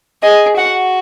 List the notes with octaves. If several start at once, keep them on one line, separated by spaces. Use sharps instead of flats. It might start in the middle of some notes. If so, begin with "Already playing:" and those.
G#4 D#5
F#4 F#5